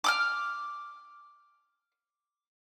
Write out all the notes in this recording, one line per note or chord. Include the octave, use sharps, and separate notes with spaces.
D6 D#6 F6